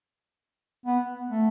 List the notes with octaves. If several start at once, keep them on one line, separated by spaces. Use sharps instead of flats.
B3
A3